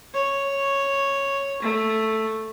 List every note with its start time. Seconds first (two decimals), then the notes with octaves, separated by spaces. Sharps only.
0.14 C#5
1.62 A3